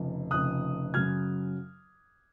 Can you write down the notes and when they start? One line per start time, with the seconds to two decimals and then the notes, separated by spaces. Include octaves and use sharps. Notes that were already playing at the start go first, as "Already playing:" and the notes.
Already playing: F1 F2 C#3
0.31 F1 F2 C#3 D#6 F#6
0.94 F#2 C#3 F#3 F6 G#6